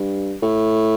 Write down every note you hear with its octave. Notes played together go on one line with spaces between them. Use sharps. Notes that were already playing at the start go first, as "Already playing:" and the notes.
Already playing: G2
A2